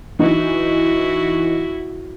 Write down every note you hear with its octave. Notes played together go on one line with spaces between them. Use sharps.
E3 D#4 E4 F#4